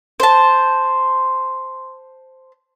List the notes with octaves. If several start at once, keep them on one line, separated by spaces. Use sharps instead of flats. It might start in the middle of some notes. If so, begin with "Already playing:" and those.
C5 A5